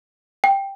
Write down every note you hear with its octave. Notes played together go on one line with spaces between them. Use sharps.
G5